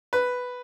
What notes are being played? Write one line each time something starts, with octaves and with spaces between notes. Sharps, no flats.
B4